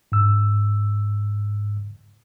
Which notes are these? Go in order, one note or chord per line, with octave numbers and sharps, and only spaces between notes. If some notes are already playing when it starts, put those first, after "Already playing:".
G#2 E6